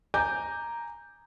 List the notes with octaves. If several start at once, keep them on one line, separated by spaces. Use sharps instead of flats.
G#5 A#5 D6 G6